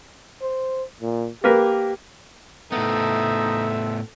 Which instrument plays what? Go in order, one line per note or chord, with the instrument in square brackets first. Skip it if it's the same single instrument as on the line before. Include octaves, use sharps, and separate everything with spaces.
[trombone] C5
A#2
[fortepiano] A#3 A#4 B4 [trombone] G4
[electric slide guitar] A2 B3 [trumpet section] C4 E5 [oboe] D#4 [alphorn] A4